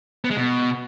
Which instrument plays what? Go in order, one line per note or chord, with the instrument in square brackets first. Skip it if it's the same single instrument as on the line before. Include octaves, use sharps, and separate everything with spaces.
[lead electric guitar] B3
G#3
B2